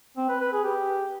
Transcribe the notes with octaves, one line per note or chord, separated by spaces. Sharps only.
C4
B4
B4
G#4
G4